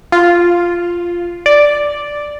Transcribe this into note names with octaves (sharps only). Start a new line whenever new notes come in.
F4
D5